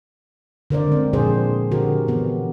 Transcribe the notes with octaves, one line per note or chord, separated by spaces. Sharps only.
D3 A#4 C5 D5
G#3 C4
A#2 F3 D4 G#4 C5
D3 F#4 G4 A#4
E3 B3